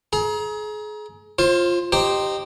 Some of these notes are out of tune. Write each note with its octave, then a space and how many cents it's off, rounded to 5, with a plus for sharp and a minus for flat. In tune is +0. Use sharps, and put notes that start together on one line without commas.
G#4 +35 A#5 +30
F4 +0 C5 +30
D#4 -20 G4 -5 C5 +0